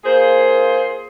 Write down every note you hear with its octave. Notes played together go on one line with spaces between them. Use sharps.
A#3 F4 G#4 C5